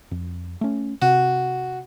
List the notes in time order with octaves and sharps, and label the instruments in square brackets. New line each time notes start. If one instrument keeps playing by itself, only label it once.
[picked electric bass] F2
A3 C#4
[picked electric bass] C3 [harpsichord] F#4